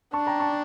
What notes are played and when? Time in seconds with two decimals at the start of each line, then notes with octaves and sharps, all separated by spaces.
0.13 D4 A5 C#6
0.27 G5 A#5
0.40 A5 C#6